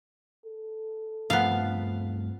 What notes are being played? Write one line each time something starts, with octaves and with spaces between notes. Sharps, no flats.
A4
G2 F3 A3 B3 C4 F5